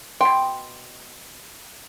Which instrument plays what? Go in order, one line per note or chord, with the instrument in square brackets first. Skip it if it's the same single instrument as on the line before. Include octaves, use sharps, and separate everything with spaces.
[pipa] B2 C6 [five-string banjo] G5